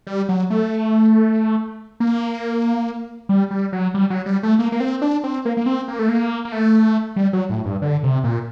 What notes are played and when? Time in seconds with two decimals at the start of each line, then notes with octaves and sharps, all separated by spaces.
0.07 G3
0.29 F#3
0.50 A3
2.00 A#3
3.29 G3
3.51 G3
3.73 F#3
3.94 G3
4.10 F#3
4.26 G3
4.43 A3
4.59 A#3
4.72 A#3
4.80 C4
5.02 D4
5.24 C4
5.45 A#3
5.57 A#3
5.66 C4
5.88 A#3
5.99 A3
6.09 A#3
6.45 A#3
6.52 A3
7.16 G3
7.33 F#3
7.50 A2
7.65 G2
7.82 D3
8.04 C3
8.24 A#2